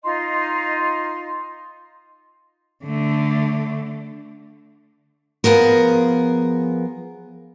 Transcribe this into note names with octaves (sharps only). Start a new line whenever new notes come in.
D#4 F4 D#5 C6
D3 A3
F3 B3 G#4 A#4